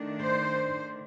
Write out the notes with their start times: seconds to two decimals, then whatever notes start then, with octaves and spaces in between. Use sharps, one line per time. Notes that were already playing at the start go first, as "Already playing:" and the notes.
Already playing: D#3 A3 D4
0.24 C5